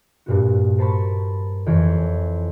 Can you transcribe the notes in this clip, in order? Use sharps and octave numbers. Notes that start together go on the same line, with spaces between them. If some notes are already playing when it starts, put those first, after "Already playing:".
G2 A#2 F#4
A#4 C5 A5 B5 C#6
F2 E3 C#5 G#5